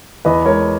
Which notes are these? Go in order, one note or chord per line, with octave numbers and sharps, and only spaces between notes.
E2 B4 D#5
G#3 A#4 C#5